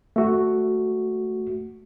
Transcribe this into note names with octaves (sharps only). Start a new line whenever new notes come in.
A3 F#4